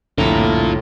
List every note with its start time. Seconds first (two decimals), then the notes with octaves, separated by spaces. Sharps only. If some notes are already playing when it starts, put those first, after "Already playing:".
0.18 C2 F2 A2 D3 F4 A#5